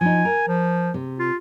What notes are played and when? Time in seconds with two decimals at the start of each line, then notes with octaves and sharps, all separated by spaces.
0.01 F3 D#4 G#5
0.25 A#4
0.48 F3
0.94 C3
1.19 F4